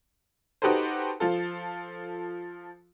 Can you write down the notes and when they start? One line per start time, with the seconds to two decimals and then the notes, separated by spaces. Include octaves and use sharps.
0.62 D#4 F#4 G4 A4 B4 C5
1.20 F3 F4 A4